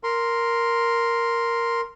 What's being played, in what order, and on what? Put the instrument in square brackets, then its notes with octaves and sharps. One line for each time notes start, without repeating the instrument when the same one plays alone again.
[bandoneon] A#4 C6